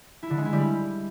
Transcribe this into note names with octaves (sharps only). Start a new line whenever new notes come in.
E4
D3
G#3
E4
G3